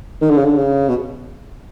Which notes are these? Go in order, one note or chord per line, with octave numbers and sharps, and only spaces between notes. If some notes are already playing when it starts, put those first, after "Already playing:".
D#3
D3
C#3
D3
C#3
B2